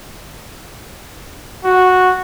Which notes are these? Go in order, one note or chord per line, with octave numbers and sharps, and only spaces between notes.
F#4